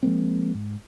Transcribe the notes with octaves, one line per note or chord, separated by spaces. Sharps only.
F3 G#3 A#3 C4
G#2